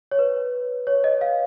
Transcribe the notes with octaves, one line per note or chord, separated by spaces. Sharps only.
C#5
B4
C#5
D#5
F5